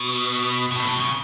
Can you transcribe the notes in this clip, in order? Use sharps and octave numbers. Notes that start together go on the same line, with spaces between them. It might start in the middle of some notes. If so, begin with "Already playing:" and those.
Already playing: B2
B2
A2
B2
C#3